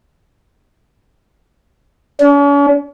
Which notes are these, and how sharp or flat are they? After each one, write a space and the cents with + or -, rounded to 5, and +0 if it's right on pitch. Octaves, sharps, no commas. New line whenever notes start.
C#4 +45